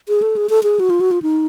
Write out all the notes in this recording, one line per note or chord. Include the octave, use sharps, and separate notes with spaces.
G#4
A4
G#4
A4
G#4
F#4
F4
F#4
F4
D#4